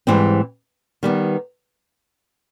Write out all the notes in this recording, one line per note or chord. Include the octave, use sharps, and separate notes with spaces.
G#2 E3 G3 C4
D#3 G3 B3